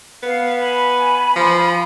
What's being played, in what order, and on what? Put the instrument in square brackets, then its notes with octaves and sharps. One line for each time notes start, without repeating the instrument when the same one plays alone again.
[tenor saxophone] B3 [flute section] F5
[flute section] G#5 B5
[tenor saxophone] F3